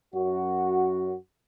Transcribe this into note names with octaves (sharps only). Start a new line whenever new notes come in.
F#2 F#4